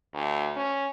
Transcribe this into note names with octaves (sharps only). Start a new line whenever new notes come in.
D2
C#4